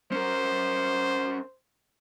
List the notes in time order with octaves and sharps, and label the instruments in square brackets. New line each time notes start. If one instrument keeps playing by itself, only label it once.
[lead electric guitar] C#4 A#4 [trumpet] C5